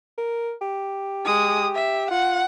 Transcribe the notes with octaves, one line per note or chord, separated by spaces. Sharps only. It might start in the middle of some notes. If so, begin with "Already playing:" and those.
A#4
G4
G#3 D#6
E5
F4 F#5